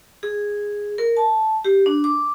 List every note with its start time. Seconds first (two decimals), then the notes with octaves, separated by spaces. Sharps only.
0.23 G#4
0.98 A#4
1.17 A5
1.64 G4
1.86 D4
2.04 D6